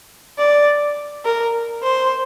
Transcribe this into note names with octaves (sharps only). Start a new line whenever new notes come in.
D5
A#4
C5